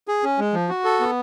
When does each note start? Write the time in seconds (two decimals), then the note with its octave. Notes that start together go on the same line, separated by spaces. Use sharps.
0.08 G#4
0.23 C#4
0.39 G#3
0.54 F3
0.69 F#4
0.85 A4
1.00 B3